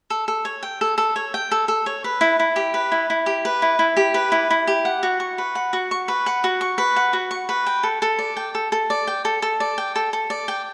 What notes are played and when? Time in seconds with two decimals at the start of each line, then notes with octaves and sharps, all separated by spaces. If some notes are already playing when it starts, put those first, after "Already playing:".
0.10 A4
0.28 A4
0.45 C#5
0.63 G5
0.81 A4
0.98 A4
1.16 C#5
1.34 G5
1.51 A4
1.68 A4
1.86 C#5
2.04 B4
2.21 E4
2.40 E4
2.56 G4
2.74 B4
2.92 E4
3.10 E4
3.26 G4
3.45 B4
3.62 E4
3.79 E4
3.97 G4
4.14 B4
4.32 E4
4.51 E4
4.67 G4
4.85 F#5
5.03 F#4
5.20 C#6
5.38 B4
5.55 F#5
5.73 F#4
5.91 C#6
6.08 B4
6.26 F#5
6.44 F#4
6.61 C#6
6.78 B4
6.96 F#5
7.13 F#4
7.31 C#6
7.49 B4
7.66 G5
7.83 A4
8.02 A4
8.19 D5
8.37 G5
8.55 A4
8.72 A4
8.90 D5
9.07 G5
9.25 A4
9.42 A4
9.60 D5
9.78 G5
9.96 A4
10.13 A4
10.30 D5
10.48 G5